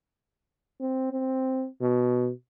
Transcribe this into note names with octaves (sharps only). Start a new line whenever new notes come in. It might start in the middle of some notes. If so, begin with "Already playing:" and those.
C4
C4
B2